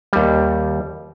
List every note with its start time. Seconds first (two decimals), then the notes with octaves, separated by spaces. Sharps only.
0.13 D#2 G3